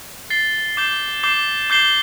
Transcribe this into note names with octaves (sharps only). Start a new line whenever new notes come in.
A6 C7 G7
D6 G6 C7 G7
D6 G6 C7 G7
D6 G6 C7 G7